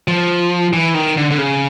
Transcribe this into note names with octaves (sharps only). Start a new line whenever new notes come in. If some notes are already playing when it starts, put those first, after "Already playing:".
F3
E3
D#3
D3
D3
C#3